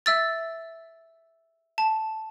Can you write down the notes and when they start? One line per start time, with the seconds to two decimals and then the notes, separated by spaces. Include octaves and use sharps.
0.06 E5 E6 A6
1.78 A5